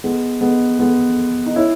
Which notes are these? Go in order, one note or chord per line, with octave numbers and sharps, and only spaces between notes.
G#3 B3
G#3 B3
G#3 B3
D#4
C#4 E4